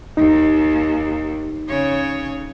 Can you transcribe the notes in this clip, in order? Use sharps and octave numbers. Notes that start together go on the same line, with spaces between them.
D#2 D#4
C#3 C#5